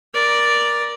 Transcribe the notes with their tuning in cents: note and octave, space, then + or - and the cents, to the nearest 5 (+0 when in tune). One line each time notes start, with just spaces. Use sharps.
A#4 +20 D5 +0